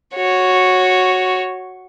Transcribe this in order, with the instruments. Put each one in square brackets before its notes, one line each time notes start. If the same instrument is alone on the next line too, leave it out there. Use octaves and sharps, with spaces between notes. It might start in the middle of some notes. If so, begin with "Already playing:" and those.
[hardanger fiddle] F#4 C#5